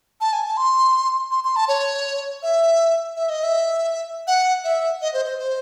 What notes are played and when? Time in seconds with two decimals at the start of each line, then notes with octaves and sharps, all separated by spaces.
0.21 A5
0.33 G#5
0.46 A5
0.57 C6
1.31 C6
1.45 C6
1.56 A5
1.68 C#5
2.43 E5
3.17 E5
3.29 D#5
3.43 E5
4.27 F#5
4.64 E5
5.02 D#5
5.14 C5
5.26 C5
5.39 C5